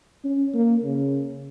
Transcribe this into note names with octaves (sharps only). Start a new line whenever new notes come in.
C#4
A#3
C#3